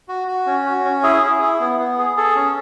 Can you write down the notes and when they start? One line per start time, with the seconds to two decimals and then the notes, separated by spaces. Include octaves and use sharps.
0.09 F#4
0.28 F#4
0.46 C#4
0.66 F#4
0.85 C#4
1.03 E4 G#4
1.22 G#4
1.42 E4
1.60 B3
1.79 B3
1.98 G#4
2.17 G#4 A4
2.36 C#4